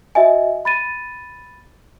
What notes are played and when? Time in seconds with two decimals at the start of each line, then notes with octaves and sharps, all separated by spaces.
0.15 F#4 D#5 E5 G#5
0.65 B5 A6 D#7